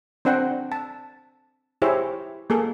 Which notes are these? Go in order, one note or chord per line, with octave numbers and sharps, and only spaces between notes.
C4 D4 C5 F#5 G5
A5
E4 G4 G#4 C5 C#5 E5
A#3 G#4 A4